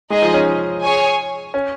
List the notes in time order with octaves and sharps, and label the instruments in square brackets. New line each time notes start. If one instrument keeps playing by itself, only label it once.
[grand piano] G#3 [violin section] D#4 G#4 D#5
[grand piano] F3
C#4
[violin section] G#4 C#5 G#5
[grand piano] C#4